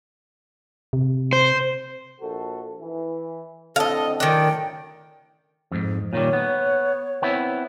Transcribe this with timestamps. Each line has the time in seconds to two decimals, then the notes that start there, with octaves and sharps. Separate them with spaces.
0.93 C3
1.33 C5
2.20 A#1 F#4 A4
2.80 E3
3.76 A2 D3 C4 A4 D#5 F5
4.20 F#2 A2 D#3 D4 G5
5.71 F2 G#2
6.13 A#2 D#3 G3 C#5
6.33 B3
7.22 B3 C4 E4